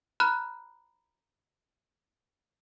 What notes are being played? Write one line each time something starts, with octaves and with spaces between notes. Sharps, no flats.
A#5 B5 F6 F#6